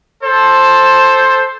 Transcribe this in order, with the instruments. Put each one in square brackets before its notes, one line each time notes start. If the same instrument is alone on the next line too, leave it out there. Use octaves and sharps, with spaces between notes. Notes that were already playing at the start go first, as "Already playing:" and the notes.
[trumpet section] A4 C5